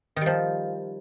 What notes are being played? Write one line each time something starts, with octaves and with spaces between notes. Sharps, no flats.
D#3 F3 G3